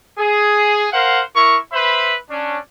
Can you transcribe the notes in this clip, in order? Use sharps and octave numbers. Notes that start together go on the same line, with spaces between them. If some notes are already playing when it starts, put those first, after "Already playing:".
G#4
A#4 C5 F5 F#5
E4 A#4 C#6
B4 C5 E5 B5
C#4 D4